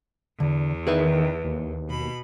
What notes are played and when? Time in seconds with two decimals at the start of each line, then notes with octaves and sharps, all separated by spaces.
0.40 E2 D3
0.87 D#3 G#4 B4 E5
1.44 D#2
1.89 B2 B5